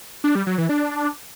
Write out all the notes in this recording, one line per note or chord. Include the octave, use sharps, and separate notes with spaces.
D4
G3
F#3
E3
D4